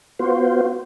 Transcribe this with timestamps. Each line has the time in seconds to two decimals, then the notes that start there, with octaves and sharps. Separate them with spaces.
0.19 B3 F4 F#4 C5